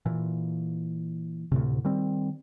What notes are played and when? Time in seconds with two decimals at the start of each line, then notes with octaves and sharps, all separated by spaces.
0.06 A#2 E3
1.52 D2 A2 C3
1.84 D#3 G3 C4